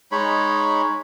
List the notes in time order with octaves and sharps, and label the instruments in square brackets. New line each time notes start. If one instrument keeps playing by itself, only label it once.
[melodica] G#3 D#4 C#5 B5